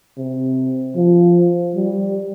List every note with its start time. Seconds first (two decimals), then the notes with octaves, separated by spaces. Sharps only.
0.18 C3
0.96 F3
1.76 G3